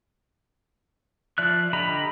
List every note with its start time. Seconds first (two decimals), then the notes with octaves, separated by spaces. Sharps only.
1.38 F3 D5 E5 F6 F#6
1.73 D3 G4 D#5 A#5 B5